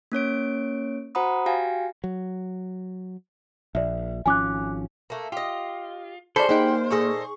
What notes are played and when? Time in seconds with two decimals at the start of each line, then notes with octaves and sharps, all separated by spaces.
0.12 A#3 C#4 C#5 D7
1.15 F#4 C5 F#5 A#5 B5 D#6
1.46 F#4 G4 F5 G5 G#5 A#6
2.04 F#3
3.75 A#1 D5 E5
4.26 G#1 F3 C#4 G#5 D6 F#6
5.10 A3 A#3
5.32 F4 G4 D#5
6.36 F3 G#3 A4 C5 D5 B5
6.49 A#3 D#4 G4 G#4 F#5 G5
6.91 A#2 G#4 A4 D#5 C#6